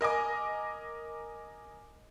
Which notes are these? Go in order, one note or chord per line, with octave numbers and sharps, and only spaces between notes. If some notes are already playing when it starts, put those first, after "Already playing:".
A#4 D#5 G#5 D6